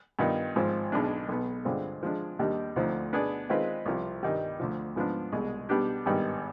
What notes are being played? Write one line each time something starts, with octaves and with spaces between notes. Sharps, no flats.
G2 D#3 B3 F4
G#1 G#2 F3 C4
B1 B2 G#3 D4
B1 B2 B3
G2 D3 G#3 C4 F4
F3 G#3 D4
D#2 D#3 G3 D4 G4
D2 D3 F3 C4 D#4
B2 B3 D4 G#4 D5
D#3 G#3 C4 F4 B4
C2 C3 F3
G2 D#3 G3
D2 D3 F3
G#2 F3 B3 D4
C2 B2 G#3
B2 G3 B3 D4 G4
G#1 G2 D#3 G3 B3